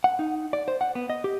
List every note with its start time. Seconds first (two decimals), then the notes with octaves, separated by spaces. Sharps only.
0.04 F#5
0.19 D#4
0.53 D5
0.68 C5
0.81 F#5
0.95 B3
1.10 D#5
1.24 G4